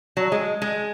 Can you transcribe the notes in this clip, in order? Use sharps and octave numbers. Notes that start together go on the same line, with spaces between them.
F#3
G#3
G#3